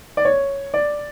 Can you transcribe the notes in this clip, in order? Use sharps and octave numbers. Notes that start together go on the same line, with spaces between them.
D5
C#5
D5